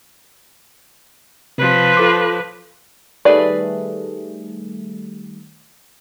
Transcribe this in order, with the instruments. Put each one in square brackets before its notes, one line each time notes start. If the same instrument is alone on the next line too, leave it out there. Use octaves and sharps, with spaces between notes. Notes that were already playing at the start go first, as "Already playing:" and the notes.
[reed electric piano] C3 [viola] F3 B4
[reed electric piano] F4 A4 D6
[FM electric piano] D#3 G3 A3 [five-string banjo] G#4 B4 D5